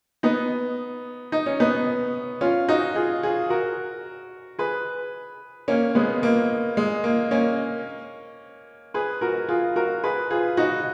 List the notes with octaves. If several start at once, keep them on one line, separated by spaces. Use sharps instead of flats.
B3 D#4
D#4
C#4
B3 D#4
C#4 F4
D#4 F#4
F4 G#4
F4 G#4
F#4 A#4
G#4 B4
A#3 C#4
G#3 B3
A#3
G#3
A#3
A#3 C#4
G#4 B4
F#4 A#4
F4 G#4
F#4 A#4
G#4 B4
F4 G#4
D#4 F#4